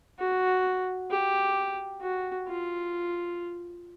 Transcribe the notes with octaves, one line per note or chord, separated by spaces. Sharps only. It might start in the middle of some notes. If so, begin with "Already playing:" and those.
F#4
G4
F#4
F4